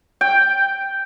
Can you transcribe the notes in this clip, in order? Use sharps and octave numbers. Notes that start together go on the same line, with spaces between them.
G5